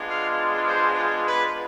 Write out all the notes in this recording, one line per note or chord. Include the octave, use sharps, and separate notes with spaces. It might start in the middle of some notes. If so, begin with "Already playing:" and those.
Already playing: G#3 B3 D4 F4
F5
C5
B4